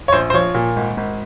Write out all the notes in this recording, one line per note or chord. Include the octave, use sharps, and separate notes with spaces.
C#5
A#1 C5
C5
F3 C#5
A#2
G#1
G#1